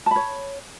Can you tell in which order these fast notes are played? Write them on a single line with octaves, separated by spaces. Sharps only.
A5 B5 C#5